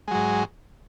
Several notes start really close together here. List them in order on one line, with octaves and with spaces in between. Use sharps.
G#3 F#3 G#2